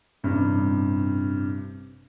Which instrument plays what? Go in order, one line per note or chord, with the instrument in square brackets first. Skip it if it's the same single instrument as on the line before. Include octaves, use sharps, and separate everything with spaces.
[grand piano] A1 G2 C3